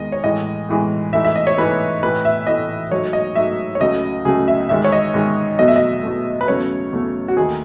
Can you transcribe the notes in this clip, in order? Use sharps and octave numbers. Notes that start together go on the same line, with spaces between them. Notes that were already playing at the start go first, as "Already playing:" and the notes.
Already playing: E2 D#3 G#3 D#5
C#5
A2 E3 G#3 D#5
A2 E3 G#3
G#2 E3 A3 E5
E5
D#5
C#5
G#2 E3 A3 B4
A2 E3 A3 B4
E5
A2 E3 A3 D#5
G#2 F#3 A3 C#5
D#5
G#2 F#3 A3 E5
C#5
C#2 C#3 F#3 A3 D#5
C#2 C#3 F#3 A3 G#4
E5
G#2 D#3 G#3 E5
C#5
D#5
G#2 D#3 G#3
E2 B2 F#3 A3 D#5
E5
D#5
E2 B2 F#3 A3
B4
E2 C#3 F#3 A3 C#5
E2 C#3 F#3 A3
F#4
D#2 D#3 A3 G#4